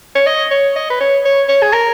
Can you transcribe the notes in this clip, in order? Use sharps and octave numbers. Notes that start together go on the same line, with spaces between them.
C#5
D#5
C#5
D#5
B4
C#5
C#5
C#5
G#4
A#4